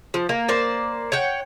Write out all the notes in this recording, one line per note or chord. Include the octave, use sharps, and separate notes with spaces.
F3
A#3
A#3 C5 D5
C#5 F#5 G5